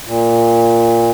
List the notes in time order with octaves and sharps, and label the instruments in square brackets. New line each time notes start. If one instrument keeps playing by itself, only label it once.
[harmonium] A#2